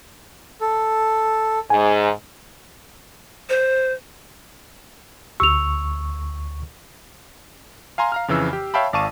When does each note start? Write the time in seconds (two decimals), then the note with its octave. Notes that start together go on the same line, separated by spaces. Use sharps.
0.61 A4
1.70 G#2 G#5
3.49 C5
5.40 D2 C#6 E6 F7
7.98 F5 G#5 A#5 C6
8.12 F5 A#5 F6
8.28 F2 C#3 E3 E6 C7
8.53 G4
8.74 C#5 E5 F5 G5 A5 B5
8.93 G#1 D5 F5 A5 C#6 D#7